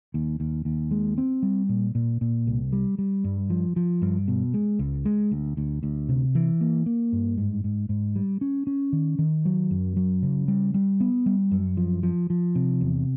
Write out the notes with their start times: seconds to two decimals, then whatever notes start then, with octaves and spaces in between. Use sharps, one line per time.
0.14 D#2
0.40 D#2
0.65 D#2
0.91 G#3
1.18 C4
1.43 G3
1.69 A#2
1.95 A#2
2.21 A#2
2.47 C2
2.73 G3
2.98 G3
3.24 G2
3.50 F3
3.76 F3
4.02 G2
4.28 B2
4.54 G#3
4.79 C#2
5.05 G#3
5.31 D2
5.57 D2
5.83 D2
6.09 C3
6.35 E3
6.61 A#3
6.86 A#3
7.12 G2
7.37 G#2
7.64 G#2
7.89 G#2
8.16 G3
8.41 C#4
8.67 C#4
8.93 D#3
9.19 D#3
9.45 F#3
9.71 F#2
9.96 F#3
10.23 C#3
10.48 G3
10.74 G3
11.00 B3
11.26 G3
11.51 F#2
11.77 F3
12.03 F3
12.30 F3
12.55 C3
12.81 E2